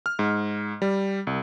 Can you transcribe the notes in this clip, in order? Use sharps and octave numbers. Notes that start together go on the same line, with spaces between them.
F6
G#2
G3
C2